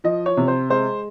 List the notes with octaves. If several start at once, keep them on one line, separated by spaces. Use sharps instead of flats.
F3 D#5
C#5
C3
C5
G#3 C5